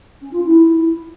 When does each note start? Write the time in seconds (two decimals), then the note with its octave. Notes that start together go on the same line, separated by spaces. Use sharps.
0.21 C#4
0.32 F4
0.44 E4